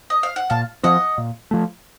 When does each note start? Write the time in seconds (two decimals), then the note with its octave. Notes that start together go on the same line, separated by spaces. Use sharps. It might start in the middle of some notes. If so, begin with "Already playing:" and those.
0.10 D#5
0.23 F5
0.36 F#5
0.50 A#2 F5 A5
0.83 F3 C4 D#5 F#5
1.18 A#2
1.51 F3 A3